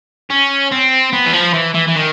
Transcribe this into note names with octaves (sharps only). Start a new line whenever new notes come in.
C#4
C4
B3
E3
F3
E3
E3
E3
D#3